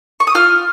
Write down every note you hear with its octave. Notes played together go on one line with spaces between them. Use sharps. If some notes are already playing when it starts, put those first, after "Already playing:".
C#6
D#6
F4 F6